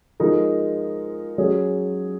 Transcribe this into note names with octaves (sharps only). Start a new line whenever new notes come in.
F3 G#3 D#4 A#4
F#3 C#4 G#4